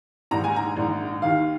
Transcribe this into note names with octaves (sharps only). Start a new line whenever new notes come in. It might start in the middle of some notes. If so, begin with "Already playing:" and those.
A#1 G#2 D#3 A#5
G#5
A#5
A#1 G#2 D#3
D#2 D#3 F5